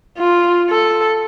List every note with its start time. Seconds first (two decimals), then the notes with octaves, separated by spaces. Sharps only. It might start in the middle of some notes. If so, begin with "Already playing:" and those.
0.18 F4
0.69 A4